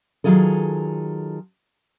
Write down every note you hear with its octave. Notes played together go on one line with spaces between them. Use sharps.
D#3 F#3 F4 G#4 A4